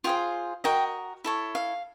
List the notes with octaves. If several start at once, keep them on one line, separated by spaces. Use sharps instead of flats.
F4 G#4 C5 G5
F#4 A#4 D#5 G5
E4 A4 C#5
F5